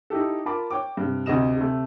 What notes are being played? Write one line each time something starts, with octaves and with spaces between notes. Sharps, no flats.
D#4 E4 G4 A4
F4 A#4 A5 B5 D6
C#5 G5 D6
G2 C3
D2 C3 D#5 E7
C3 A3